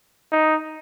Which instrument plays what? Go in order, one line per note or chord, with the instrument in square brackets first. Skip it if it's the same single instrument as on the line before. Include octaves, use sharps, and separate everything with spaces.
[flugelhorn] D#4